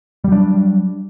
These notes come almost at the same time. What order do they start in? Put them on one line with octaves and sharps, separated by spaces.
G3 F#3 D4